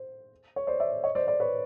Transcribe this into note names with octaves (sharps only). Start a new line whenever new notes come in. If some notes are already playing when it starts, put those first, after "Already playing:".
Already playing: C5
C#5
C5 D5
D5 E5
C#5 D#5
C5 D5
C5 D5
B4 C#5